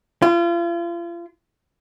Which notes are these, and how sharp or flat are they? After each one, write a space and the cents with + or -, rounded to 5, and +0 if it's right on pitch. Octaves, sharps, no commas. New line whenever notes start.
F4 -35